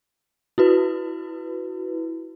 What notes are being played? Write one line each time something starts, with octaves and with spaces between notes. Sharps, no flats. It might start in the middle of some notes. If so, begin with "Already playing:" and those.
E4 F#4 B4